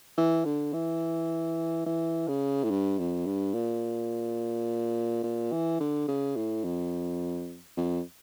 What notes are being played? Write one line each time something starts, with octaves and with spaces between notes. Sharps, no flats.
E3
D3
E3
E3
C#3
A2
G2
F2
G2
A#2
A#2
E3
D3
C#3
A2
F2
F2